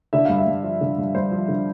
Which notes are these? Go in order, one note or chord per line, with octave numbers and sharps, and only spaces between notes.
D3 E5
G2 F5
E5
G2
F3
D3
G2
G2 C5
F3
D3